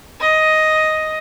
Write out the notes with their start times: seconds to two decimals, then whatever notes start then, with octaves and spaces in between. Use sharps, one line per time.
0.21 D#5